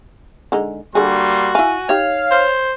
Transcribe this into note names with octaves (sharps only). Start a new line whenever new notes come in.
D3 G#3 D#4
D3 G3 A#3 F#4 G#4 C6
E4 F5 G#5
D#4 G4 C#5 F5
C5